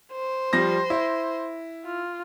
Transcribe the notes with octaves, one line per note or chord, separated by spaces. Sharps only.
C5
F3 G3 A#6
E4
F4